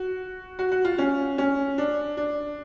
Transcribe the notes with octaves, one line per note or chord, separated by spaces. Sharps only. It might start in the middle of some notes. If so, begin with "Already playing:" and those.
Already playing: F#4
F#4
F#4
F4
C#4
C#4
D4
D4